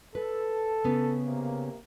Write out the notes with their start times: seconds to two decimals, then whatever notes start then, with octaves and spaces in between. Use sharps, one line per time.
0.15 A4 B4
0.84 C#3 B3
1.26 C3 A#3